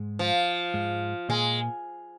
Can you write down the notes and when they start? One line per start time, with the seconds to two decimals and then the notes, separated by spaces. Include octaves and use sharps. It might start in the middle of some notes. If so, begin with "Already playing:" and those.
Already playing: G#2 G#3
0.19 F3
0.74 G#2 G#3
1.29 A#2 G#3 A#3